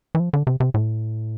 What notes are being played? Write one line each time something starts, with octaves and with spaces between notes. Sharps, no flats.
E3
F3
D3
C3
C3
A2